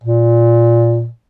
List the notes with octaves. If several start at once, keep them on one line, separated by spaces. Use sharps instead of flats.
A#2